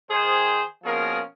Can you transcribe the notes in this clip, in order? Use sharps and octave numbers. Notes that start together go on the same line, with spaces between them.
D#3 G#4 C5
B2 F3 A#3 C#4 G#4 A#4